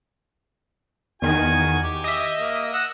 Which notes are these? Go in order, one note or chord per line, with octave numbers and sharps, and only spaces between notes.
E2 D#3 F#4 G#5
G4
D#5 E5
A#3
D#5 F#5 E6